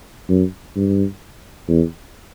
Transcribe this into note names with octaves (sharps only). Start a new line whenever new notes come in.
F#2
G2
E2